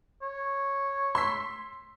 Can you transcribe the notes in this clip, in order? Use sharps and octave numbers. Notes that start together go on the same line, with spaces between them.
C#5
C6 E6 B6